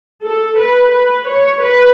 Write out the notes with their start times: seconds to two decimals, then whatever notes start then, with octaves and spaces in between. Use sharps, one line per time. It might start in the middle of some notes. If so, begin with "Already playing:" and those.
0.24 A4
0.59 B4
0.93 B4
1.28 C#5
1.63 B4